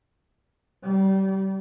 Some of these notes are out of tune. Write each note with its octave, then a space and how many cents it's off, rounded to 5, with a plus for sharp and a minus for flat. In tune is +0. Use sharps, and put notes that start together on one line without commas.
G3 -25